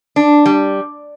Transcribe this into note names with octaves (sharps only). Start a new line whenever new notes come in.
D4
G3